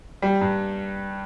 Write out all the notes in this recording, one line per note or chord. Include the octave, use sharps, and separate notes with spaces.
G3
G2